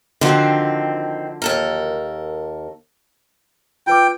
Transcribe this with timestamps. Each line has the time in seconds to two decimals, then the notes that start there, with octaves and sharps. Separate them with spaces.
0.21 D3 D#3 F3 C4 F#4
1.42 D#2 A4 A#4
3.87 F4 B4 G5 D6